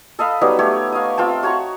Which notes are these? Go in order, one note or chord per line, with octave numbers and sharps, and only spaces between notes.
A4 D#5 F5 B5
F#3 G3 B3 D#4
A3 G4 C#5
D#5 F5
C4 F4 G5 A5
F#4 C#5 A#5 C#6